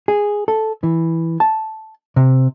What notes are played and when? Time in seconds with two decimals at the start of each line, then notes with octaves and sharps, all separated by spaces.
0.08 G#4
0.48 A4
0.83 E3
1.40 A5
2.16 C3